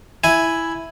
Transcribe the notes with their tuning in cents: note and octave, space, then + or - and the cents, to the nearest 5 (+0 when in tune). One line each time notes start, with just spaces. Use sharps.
E4 +0 G#5 +0